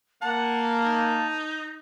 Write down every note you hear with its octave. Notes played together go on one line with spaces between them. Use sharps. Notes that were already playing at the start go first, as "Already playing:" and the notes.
A#3 F#5 A5
D#4